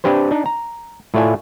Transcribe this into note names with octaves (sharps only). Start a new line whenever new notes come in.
C4 D4 G4 B4 C5
D4 D#4
A#5
A2 A3 F4 D5 G#5